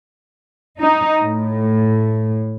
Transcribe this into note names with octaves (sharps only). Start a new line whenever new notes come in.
D#4
A2